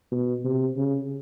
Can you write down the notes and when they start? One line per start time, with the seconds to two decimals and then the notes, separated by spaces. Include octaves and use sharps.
0.11 B2
0.44 C3
0.77 C#3